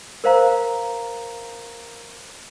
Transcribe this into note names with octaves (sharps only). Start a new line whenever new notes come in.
A#4 C5 F5 A#5